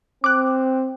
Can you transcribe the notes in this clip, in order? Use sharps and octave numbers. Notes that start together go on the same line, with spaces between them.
C4 D6 F#6